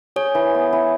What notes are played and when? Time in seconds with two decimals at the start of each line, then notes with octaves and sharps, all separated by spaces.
0.16 G#4 C#5
0.35 E3
0.55 B3
0.73 E4